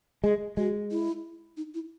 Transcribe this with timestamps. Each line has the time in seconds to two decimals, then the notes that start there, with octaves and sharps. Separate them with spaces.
0.24 G#3 G#4
0.57 G#3 F#4
0.91 E4
1.57 D#4
1.74 E4